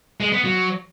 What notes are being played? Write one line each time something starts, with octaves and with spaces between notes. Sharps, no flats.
G#3
B3
F#3